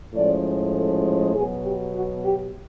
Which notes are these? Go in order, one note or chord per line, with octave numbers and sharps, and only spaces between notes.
A2 F3 G#3 C#4 D5
A4
B2 F#3 B3 G#4
G4
F#4
G4